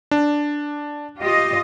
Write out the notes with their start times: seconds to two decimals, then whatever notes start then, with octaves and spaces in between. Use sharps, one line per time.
0.11 D4
1.19 F4 G4 D#5